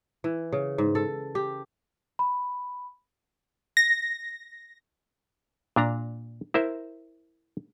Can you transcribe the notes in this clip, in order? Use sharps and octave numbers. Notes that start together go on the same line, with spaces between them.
E3
C#3
G#2
A4
G4
B5
A#6
A#2 D4 A#5
E4 A#4 C5 E5